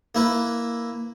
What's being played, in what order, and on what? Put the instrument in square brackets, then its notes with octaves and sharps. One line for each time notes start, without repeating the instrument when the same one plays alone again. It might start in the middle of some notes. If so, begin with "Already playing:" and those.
[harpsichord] A#3 E4 B4